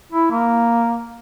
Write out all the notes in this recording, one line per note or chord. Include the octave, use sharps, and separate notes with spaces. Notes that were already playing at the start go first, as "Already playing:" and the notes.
E4
A#3